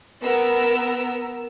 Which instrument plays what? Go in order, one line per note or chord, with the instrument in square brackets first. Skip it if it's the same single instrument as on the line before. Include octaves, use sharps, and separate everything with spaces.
[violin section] B3 A#4 E6